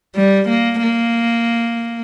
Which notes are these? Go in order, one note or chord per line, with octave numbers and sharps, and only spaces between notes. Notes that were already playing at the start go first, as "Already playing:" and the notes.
G3
A#3
A#3